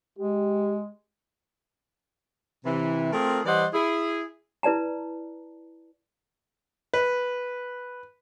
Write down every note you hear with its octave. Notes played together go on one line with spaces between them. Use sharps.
G#3 G4
C3 E3
A3 C4 F4 G#4 A#4
E3 G3 C5 D5 D#5 F#5
E4 G#4
E4 B4 D5 A5 A#5
B4